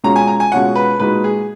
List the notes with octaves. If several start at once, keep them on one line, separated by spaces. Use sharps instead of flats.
B2 G#3 C#4 F4 A#5
G#5
A#5
G#5
B2 G#3 C#4 F4 F#5
B4
A#2 G#3 D#4 F#4 B4
G#4